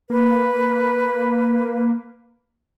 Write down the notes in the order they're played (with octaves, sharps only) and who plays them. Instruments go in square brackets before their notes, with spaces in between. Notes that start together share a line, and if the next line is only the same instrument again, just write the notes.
[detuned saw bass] A#3 [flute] B4